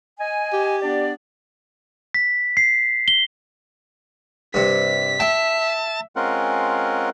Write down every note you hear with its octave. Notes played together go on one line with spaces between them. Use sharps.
D#5 G#5
G4
B3 D4 D5
B6
C7
G7
G2 C3 B6
E5 G5 A5
G#3 C4 C#4 F4 A#4 F#5